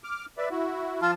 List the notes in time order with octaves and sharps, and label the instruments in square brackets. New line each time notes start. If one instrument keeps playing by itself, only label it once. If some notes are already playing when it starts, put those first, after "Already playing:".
[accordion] D6 F6
B4 D5 E5
E4 F#4
[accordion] F3 A5 [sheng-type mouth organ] F4